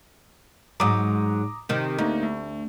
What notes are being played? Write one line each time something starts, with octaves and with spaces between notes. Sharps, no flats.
G#2 F#3 A#5 D6 D#6
C3 D#3
D2 A#3 D#4
A3